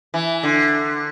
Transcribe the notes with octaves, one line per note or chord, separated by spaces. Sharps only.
E3
D3